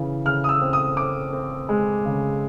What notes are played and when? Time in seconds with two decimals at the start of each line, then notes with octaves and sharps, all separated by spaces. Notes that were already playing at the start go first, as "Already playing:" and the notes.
Already playing: C#3 E3
0.25 C#3 F6
0.44 D#6
0.49 E6
0.61 C4
0.73 D#6
0.97 C4 D6
1.33 C4
1.69 G#3
2.05 C#3